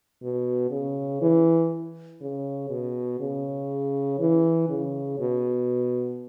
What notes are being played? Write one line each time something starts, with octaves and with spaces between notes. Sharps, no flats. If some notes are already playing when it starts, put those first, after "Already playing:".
B2
C#3
E3
C#3
B2
C#3
E3
C#3
B2